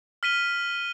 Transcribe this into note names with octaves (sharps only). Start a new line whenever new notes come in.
F6 B6 D#7 G7